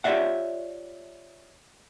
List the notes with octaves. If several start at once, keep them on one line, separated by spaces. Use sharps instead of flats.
F4 G4 C#5 D5 E5 F#5